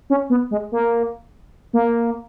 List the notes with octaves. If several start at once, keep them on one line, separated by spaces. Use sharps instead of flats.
C#4
B3
G#3
A#3
A#3